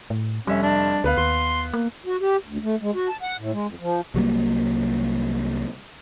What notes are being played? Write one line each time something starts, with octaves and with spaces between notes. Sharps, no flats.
A2
F1 G3 C#4 E5
D4
D2 B3 B4 F5
D#2 C6
A#3
F#4
G4
D2
A3
G#3
F#4
A5
F#5
A2
G#3
F2
F3
C2 F#3 G3 A#3